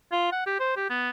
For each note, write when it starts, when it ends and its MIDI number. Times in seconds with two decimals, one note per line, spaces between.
0.12 0.31 65
0.32 0.46 78
0.46 0.57 67
0.60 0.74 72
0.76 0.88 67
0.90 1.10 59